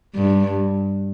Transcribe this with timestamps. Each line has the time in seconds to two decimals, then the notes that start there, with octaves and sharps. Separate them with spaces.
0.15 G2